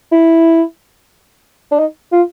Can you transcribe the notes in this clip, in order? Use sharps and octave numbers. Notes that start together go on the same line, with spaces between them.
E4
D4
D#4
F4